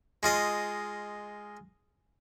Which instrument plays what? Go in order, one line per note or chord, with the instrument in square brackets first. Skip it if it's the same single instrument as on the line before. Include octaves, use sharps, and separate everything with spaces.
[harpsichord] G#3 F4 D#5